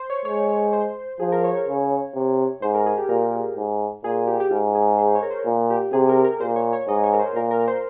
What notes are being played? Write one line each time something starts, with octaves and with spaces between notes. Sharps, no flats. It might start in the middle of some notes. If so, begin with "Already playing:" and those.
Already playing: C5
C#5
G#3 C#5
C#5
C5
F3 G#4
A#4
C#5
C#5
C#3
C3
G#2 C5
A#4
G#4
G4
A#2 A#4
G#2
A#2 G#4
G#4
G4
G4
G#2 F4
G#4
C5
C#5
A#4
C5
A#2
G4
C3 G#4
A#4
A#4
A#2 C5
C#5
C#5
G#2 D#5
C#5
A#4
C5
A#2 A#4
A#4
C5